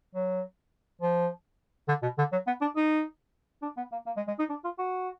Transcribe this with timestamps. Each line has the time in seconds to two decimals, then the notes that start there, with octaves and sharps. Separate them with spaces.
0.15 F#3
1.01 F3
1.88 D3
2.03 B2
2.18 D3
2.32 F#3
2.47 B3
2.61 D4
2.76 D#4
3.62 D4
3.77 B3
3.92 A#3
4.06 A#3
4.17 G#3
4.28 G#3
4.39 D#4
4.49 D4
4.64 F4
4.79 F#4